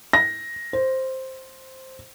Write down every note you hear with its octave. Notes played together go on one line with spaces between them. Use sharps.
A#6
C5